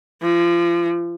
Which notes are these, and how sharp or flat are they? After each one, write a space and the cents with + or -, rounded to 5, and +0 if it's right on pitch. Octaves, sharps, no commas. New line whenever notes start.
F3 -30